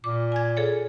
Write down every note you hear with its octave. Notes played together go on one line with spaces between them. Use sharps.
A#2 D6
G#5 G#6
G#4 A4 C#5